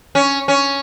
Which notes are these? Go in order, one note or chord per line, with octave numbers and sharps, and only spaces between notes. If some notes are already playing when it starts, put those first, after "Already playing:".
C#4
C#4